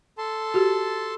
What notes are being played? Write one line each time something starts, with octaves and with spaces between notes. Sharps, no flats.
A4 A5 C6
F#4 G4